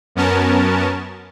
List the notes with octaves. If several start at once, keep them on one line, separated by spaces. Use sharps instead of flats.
F#2 B3 C#4 A#4 A5